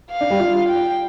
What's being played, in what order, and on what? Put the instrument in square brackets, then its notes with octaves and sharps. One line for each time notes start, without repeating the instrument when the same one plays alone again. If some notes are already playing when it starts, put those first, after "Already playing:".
[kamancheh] F5
[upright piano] D4
G3
F4
[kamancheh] G5